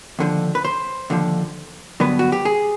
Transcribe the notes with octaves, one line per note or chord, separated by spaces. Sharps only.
D#2 D3 F3
B4
C5
D#2 D3 F3
G2 D3 F#3 B3 B4
F#4
G4
G#4